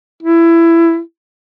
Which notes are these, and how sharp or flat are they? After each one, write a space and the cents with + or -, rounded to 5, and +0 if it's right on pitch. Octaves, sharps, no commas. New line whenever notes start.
E4 +20